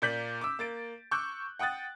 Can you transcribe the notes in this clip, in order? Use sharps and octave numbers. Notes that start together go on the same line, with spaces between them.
A#2 A#3 D5 G6 B6 F#7
D6 E6
A#3 A6 D7
C#6 D6 E6 F#6 G6
F#5 G5 D#6 F#6 A6